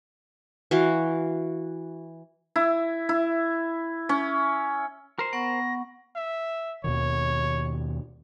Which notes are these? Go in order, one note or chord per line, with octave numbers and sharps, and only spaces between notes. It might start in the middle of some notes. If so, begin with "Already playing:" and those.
E3 F#4 F5
E4
E4
C#4
A#4 C5
B3 F#5 C#6 A#6
E5
D#2 B2 D#3 C#5